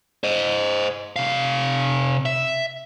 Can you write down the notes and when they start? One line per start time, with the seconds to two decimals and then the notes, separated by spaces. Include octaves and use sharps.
0.24 C5 D#5
1.16 C3 F5
2.26 E5